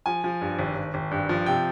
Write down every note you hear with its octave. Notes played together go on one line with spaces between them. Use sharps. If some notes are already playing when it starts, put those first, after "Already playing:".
F3 G#5
F3
G2
G#1
G#1
G#1
G2
F3
C3 G5